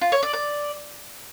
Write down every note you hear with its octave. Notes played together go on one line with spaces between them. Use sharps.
F4
C#5
D5
D5